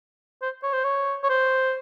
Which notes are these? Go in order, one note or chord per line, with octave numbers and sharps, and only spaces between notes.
C5
C#5
C5
C#5
C#5
C5